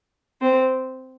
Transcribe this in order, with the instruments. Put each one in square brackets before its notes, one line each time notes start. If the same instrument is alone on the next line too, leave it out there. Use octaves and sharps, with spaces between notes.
[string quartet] C4 C5